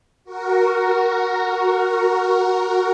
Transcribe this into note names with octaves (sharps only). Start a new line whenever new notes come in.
F#4 A#4